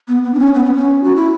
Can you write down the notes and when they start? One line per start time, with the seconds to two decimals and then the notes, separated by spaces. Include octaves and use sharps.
0.08 B3
0.24 B3
0.34 D4
0.39 C#4
0.54 B3
0.65 B3
0.75 C#4
1.04 F#4
1.16 E4